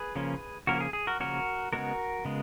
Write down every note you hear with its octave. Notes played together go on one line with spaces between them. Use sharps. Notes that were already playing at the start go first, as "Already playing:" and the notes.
Already playing: G#4 B4
C#3 F3 A#3 C#4
C#3 F3 A#3 C#4 F#4 A#4
G#4
G#4
F#4 A#4
C#3 F3 A#3 C#4 F#4 A#4
C#3 G#3 B3 F#4 A#4
C#3 G#3 B3